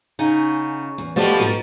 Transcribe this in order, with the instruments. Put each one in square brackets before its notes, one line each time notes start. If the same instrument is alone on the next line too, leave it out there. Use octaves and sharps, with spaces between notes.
[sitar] C#3 [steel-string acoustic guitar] D#4 F#5 G#5
[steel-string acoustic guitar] E2
[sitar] B2 F3 G3 [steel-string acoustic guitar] A3
[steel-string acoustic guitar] G#2 B3 F#4